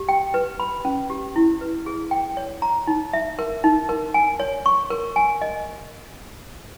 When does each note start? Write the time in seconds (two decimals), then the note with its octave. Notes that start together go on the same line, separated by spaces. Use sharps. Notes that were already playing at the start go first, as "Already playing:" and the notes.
Already playing: G4
0.09 G5
0.34 B4
0.60 B5
0.85 C#4
1.10 G4
1.36 E4
1.61 B4
1.86 G#4
2.11 G5
2.37 C#5
2.62 A#5
2.87 D#4
3.13 E5
3.39 A#4
3.64 D#4
3.89 A#4
4.14 G#5
4.40 C#5
4.66 C#6
4.90 A#4
5.16 G#5
5.42 D#5